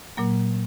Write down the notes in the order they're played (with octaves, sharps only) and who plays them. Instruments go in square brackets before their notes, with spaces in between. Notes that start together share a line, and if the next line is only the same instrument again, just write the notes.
[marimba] A#2 F#3 A#3